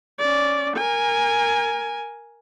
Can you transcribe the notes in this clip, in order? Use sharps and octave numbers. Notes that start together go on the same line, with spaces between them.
C#4 D5
A#4 G#5